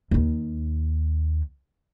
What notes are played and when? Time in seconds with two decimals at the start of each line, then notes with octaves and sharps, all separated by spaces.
0.11 D#2 D#4